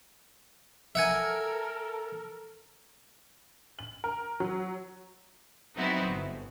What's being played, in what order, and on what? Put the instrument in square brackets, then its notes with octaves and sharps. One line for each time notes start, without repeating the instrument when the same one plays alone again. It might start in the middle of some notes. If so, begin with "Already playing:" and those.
[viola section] A4 A#4 [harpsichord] E5 F#5 G#5
[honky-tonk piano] F#7
A#4
F#3
[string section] F#3 B3 C4 D#4 E4 F#4
G1